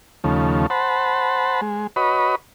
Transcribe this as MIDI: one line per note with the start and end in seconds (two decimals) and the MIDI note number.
0.24 0.66 39
0.24 0.66 49
0.24 0.66 53
0.24 0.66 57
0.70 1.61 72
0.70 1.61 78
0.70 1.61 81
0.70 1.61 83
1.61 1.87 56
1.96 2.35 66
1.96 2.35 71
1.96 2.35 73
1.96 2.35 75
1.96 2.35 83